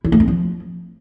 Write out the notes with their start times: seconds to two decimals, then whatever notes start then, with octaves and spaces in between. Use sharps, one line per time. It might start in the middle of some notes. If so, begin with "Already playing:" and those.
0.04 E4
0.12 A3
0.20 C4
0.28 F3